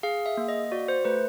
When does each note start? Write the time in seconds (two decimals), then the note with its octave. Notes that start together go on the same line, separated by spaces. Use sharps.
0.03 G#4 F5
0.26 E5
0.37 A#3
0.49 D#5
0.72 F#4 D5
0.88 C5
1.05 A3 B4